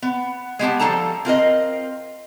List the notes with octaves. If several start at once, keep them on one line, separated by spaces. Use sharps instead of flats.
B3
G#3 B3 G4 A5
F3 G3 E4 A4 A5 A#5
C4 F4 A#4 D#5